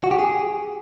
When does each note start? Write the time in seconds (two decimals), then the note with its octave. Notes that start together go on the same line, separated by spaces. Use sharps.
0.04 F#4
0.11 G4
0.19 G#4